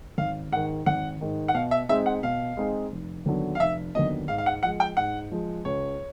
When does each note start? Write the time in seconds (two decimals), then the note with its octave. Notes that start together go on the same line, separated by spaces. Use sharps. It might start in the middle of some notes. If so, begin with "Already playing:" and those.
0.18 G#1 F5
0.52 G#2 D#3 F#5
0.86 G#1 F#5
1.21 G#2 D#3
1.48 F#5
1.54 B2 F5
1.71 E5
1.89 G#3 C4 D#4 G#4 E5
2.06 F#5
2.23 B2 F5
2.57 G#3 C4 D#4 G#4
2.92 F1
3.26 D#2 D3 F#3 B3
3.55 F5
3.60 F1 E5
3.95 D#2 D3 F#3 B3 D#5
4.28 G#2 F5
4.38 F5
4.46 F#5
4.63 F3 G#3 F#5
4.80 G5
4.97 G#2 F#5
5.31 F3 G#3
5.65 C#2 C#5